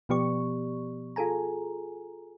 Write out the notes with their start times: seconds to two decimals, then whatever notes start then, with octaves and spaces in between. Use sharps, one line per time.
0.09 B2 F3 B3 G4 D5 C#6
1.16 F4 G#4 A4 G#5 A#5